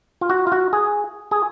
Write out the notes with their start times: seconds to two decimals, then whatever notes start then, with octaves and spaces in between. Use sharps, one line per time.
0.21 F4
0.30 F#4
0.47 F4
0.52 F#4
0.73 G#4
1.31 G#4